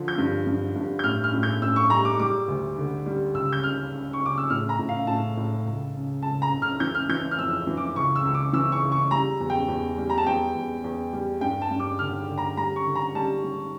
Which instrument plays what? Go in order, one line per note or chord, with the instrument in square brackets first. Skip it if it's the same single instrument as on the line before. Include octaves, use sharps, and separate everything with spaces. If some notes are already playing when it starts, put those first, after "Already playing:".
Already playing: [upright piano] D3 F3
G6
G2
G2
G2
G6
A2 F6
F6
A2
G6
A2 E6
C#6
G3 A#5
D6
G3 D6
D2
D3
G3
C#2 E6
G6
C#3 F6
C#3
C#6
C#3 D6
E6
A2 F6
A#5
A2
F5
A2 A5
A2
C#2
C#3
C#2 A5
A#5
C#2
F6
E3 G6
F6
E3 G6
F6
F2 E6
E3
D6
C#2 C#6
E6
C#2
D6
E3 E6
C#6
C#3
C#6
G3 A#5
E2
G5
E2
G3
A#5
A5
E2 G5
E2
E2
G3
G2 G5
A5
G2
D6
D3 F6
D3
A#5
G3 A#5
C#6
D3
A#5
G3 A5
G3